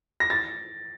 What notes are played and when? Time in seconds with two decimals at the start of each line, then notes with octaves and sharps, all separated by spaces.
0.20 A#6
0.30 A6